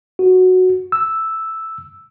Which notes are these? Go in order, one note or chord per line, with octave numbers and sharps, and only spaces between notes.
F#4
E6